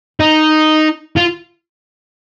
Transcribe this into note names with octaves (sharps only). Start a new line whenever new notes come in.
D#4
F4